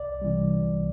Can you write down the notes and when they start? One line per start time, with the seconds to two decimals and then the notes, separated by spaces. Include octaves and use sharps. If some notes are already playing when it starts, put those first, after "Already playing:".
Already playing: C2 D5
0.22 C3 E3 G3
0.63 C2